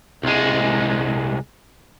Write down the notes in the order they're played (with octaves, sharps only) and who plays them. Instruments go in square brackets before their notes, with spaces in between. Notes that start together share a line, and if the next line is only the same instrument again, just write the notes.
[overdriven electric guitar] C2 G#3